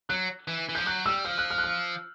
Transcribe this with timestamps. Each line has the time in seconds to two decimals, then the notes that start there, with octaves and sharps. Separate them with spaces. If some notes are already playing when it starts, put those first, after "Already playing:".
0.09 F#3 F#6
0.48 E3
0.69 E3
0.75 F3 G6
0.86 F#3 F#6
1.06 G3 E6
1.25 F3 F6
1.38 F#6
1.50 F6
1.58 F#6
1.64 F6